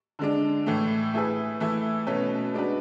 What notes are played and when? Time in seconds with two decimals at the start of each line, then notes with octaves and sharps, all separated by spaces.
0.19 D3 G#3 D4
0.66 A2 E3 A3
1.14 A3 E4 G#4 B4
1.60 E3 A3 E4
2.07 B2 A3 C#4 F#4 B4
2.54 G#3 D4 F#4 B4